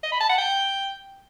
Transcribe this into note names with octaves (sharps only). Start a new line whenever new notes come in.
D#5
B5
A5
F#5
G5